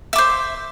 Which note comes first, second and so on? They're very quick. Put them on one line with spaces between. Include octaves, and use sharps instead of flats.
E5 D6 C5